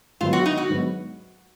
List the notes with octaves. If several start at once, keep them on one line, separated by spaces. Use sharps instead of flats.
G#2 F#3 B3 F4
F#4
D#4
F#4
G#2 F#3 B3